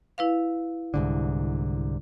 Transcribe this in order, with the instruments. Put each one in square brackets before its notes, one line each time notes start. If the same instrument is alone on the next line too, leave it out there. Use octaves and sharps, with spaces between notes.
[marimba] E4 B4 F5
[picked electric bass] C2 G#2 D3